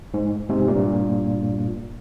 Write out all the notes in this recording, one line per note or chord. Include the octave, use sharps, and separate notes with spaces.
G#2
G#2 C3
G2 A#2